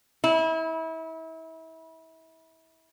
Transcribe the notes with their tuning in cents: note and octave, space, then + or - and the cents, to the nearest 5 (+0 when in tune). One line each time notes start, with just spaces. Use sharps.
E4 -30